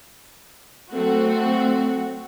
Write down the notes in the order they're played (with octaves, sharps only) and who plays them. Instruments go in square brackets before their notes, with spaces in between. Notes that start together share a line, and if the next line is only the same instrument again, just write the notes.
[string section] F#3 A3 C4 F#4